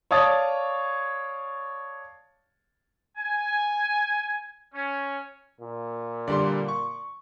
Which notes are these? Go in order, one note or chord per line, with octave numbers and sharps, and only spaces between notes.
C#5 D5 F5 A5 D#6 A6
G#5
C#4
A#2
D3 G3 D5 C6
C#6